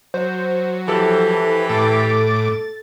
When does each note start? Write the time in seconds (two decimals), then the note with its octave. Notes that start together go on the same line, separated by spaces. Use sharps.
0.14 F#3 C5
0.88 E3 F3 G4 A4
1.69 A2 A4 D6 A6